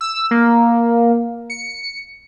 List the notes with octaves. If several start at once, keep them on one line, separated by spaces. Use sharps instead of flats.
E6
A#3
C#7